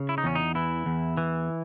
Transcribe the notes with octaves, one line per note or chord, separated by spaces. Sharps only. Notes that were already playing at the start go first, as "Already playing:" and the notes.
Already playing: C#3
E4
D#4
E2 C#4
D#4
E3 E4
E2
E3